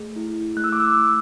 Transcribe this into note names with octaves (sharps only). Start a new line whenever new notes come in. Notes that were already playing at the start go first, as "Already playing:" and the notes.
Already playing: A3 G#4
E4
A3 F#6
E6
D6
E6
A3